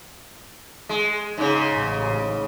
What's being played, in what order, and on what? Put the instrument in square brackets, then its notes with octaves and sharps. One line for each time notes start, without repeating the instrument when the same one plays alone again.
[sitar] G#3
G#2 C#3
[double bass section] A1